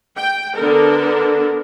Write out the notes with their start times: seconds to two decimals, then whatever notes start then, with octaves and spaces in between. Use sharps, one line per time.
0.17 G5
0.56 D3 B3 D4 A4 A#4